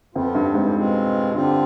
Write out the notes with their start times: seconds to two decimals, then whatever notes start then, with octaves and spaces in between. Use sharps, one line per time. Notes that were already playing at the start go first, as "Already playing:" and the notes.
0.15 F2 F3 B3 F4
0.35 G2
0.54 F2 G#2
0.75 B2 G#3 C4 F4
1.33 G2 D3 G3 C4 F4